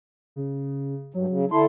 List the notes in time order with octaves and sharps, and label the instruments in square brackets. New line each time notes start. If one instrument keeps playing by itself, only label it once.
[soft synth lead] C#3
[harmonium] G2 [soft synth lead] F#3
[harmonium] C#3
[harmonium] D3 E4 A4 [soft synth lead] C6